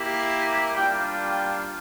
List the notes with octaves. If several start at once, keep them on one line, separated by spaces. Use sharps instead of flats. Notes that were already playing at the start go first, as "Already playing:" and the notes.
Already playing: A#3 E4 G4
G3 A#3 D4 F4 G5
G5